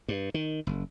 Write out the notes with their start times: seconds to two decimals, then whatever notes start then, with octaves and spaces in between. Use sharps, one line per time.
0.08 G2
0.34 D#3
0.67 F#1